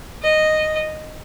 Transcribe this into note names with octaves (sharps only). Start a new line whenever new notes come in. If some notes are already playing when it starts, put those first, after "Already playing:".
D#5